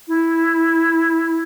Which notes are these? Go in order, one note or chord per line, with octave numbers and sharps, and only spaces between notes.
E4